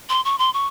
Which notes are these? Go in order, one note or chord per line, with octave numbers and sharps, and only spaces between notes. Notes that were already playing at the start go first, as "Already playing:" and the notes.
C6
C#6
C6
C#6